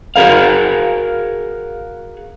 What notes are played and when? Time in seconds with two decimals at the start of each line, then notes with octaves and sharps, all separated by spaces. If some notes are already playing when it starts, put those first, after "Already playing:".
0.16 F#4 G#4 A#4 F5